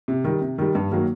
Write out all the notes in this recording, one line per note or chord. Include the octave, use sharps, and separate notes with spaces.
C3
D#3 G3
C3
D#3 G3
G2
D#3 F#3 A#3